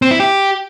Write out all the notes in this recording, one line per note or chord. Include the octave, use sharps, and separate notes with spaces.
C4
E4
G4